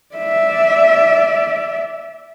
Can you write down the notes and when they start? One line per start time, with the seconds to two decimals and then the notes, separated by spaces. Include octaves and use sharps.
0.15 D5 E5